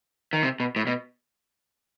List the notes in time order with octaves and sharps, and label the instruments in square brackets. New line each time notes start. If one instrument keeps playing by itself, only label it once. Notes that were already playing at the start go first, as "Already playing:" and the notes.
[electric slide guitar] D#3
C3
B2
A2
B2